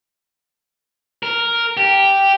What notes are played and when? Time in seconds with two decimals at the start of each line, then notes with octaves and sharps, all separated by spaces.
1.23 A#4
1.77 G4